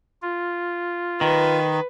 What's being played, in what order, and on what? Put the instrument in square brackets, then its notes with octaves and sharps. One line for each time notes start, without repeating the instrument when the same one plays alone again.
[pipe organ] F4
[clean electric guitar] D#3 [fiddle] B4